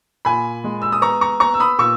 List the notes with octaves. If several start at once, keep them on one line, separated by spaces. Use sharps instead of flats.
A#2 G#5 B5
G#3
E6
D#6
B3 A#5 C#6
A#5 C#6
B3 A#5 C#6
E6
B5 D#6
A#2 C#6 E6